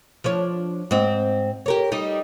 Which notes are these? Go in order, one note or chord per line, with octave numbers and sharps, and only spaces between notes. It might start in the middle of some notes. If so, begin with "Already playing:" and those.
F3 D4 C#5
G#2 C4
G4 A#4 C#5
G3 D#4